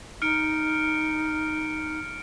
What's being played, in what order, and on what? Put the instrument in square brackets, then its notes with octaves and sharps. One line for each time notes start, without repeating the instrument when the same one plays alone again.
[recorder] D#4 [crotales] F6 C#7 D7